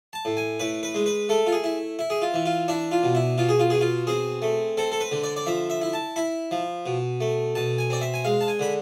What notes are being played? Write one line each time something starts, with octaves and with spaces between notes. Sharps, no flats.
A5
A2
G#5
A2 B4
B4
G#3
B4
A3 A4
F4
G#4
E4
E4
G#4
F4
E3
F4
D4 E4
F4
B2
E4
B2 F4
G#4
F4
B2 G#4
F4
C4 G#4
A3
C4 A4
A4
B4
D3
D5
D5
F3 E5
E5
E4
A5
E4 B5
F3
B2
A3
B2 A5
G#5
C4 D5
E5
G#5
G#3 F5
A5
G#5
D3 B5